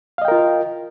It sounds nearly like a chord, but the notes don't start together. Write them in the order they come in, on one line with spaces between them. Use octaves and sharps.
F5 D#5 G5 A#4 F4